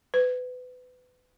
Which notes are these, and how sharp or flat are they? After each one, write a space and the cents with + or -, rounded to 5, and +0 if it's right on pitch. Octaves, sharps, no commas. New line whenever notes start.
B4 +25